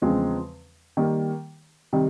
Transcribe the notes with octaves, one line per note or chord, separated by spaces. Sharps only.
E2 C#3 F3 G#3 C4
D#3 G3 A#3
C3 D#3 G3